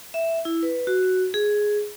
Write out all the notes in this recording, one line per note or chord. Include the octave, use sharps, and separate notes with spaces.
E5
E4
B4
F#4
G#4